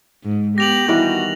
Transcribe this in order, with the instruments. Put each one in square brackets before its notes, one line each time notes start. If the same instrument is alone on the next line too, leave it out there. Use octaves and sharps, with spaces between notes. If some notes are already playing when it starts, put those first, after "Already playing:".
[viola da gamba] G#2
[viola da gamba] B3 [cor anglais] G4 [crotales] A#6 F7 F#7
[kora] D#3 E3 G3 [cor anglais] F#4